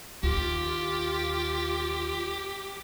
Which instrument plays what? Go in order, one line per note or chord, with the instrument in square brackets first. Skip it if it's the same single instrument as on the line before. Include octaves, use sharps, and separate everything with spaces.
[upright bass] D#2 [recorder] F4 [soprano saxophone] G4